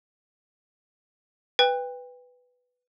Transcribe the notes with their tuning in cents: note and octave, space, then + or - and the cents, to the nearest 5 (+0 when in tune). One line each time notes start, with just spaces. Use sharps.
B4 +5 G5 +30